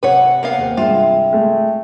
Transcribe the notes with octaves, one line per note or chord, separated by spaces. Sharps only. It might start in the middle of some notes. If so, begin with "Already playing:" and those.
C3 B4 C#5 F#5
A#3 B3 F5
D#2 C5
G2 G#3 F4 E5 G5
G#3 A3